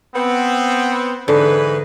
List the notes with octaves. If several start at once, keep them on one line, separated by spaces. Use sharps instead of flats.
B3 C4
G#2 D3 E3 B4